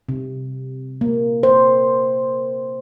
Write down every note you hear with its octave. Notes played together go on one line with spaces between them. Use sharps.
C3
A#3
C5